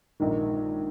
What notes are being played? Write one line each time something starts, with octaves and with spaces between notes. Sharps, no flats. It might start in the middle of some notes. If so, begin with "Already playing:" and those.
A#1 G#2 D#3